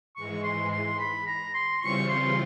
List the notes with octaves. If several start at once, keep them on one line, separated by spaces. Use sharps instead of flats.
G#2 E3 G#3 C#6
C6
C6
B5
A#5
C6
C#3 E3 G3 C4 F4 C#6
C6